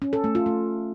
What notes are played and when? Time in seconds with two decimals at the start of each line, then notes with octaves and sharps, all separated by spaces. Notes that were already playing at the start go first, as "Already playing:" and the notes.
0.02 C#4
0.13 A4
0.24 A3
0.35 F4
0.46 A3